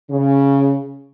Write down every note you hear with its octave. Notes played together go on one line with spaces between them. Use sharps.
C#3